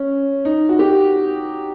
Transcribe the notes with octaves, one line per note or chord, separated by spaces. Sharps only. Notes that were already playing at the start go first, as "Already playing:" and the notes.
Already playing: C#4
D#4
F#4
G4